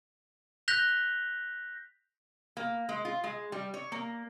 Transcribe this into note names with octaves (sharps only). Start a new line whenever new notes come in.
F#6 G6 A#6 B6 F7 G7
A#3
G#3
F4
G#3
G3
C#5
A#3